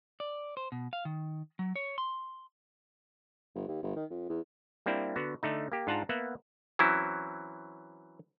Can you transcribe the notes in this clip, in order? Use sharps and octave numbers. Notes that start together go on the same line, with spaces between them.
D5
C5
B2
F5
D#3
F#3
C#5
C6
G1
D#2
G1
D#3
F2
E2
G3 A#3 C4 D4 E4
D3 B3 F#4
D3 A3 D#4
A#3 G4
G#2 D4 F4 F#5 A5 A#5
A#3 B3 E5 F#5
E3 F#3 C4 C#4 E4